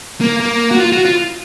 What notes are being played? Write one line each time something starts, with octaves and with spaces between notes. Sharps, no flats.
A#3
A#3
F#4
F4
F#4
F4